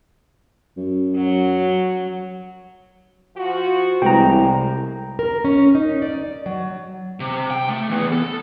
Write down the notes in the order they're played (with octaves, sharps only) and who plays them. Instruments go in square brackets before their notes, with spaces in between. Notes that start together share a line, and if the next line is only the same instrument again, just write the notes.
[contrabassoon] F#2
[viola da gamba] F#3
[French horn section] F3 F#4
[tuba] C2 [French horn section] F2 A2 [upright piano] E3 G#3 B3 [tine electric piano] G5 A#5
[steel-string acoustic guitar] A#4
C#4
D#4
D5
F#3
[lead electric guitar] C3
G5
A3
E3 B3
A4